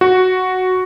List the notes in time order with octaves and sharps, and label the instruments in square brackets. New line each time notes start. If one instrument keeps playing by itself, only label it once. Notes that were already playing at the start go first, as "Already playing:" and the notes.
[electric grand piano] F#4